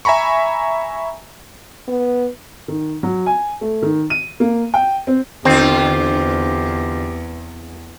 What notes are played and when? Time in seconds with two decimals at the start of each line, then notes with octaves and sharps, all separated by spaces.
0.05 E5 G#5 A#5 B5 C#6
1.88 B3
2.68 D#3
3.03 F#3
3.26 G#5
3.61 A3
3.82 D#3
4.10 D#7
4.40 A#3
4.74 G5
5.07 C4
5.45 E2 D3 C4 F4 G4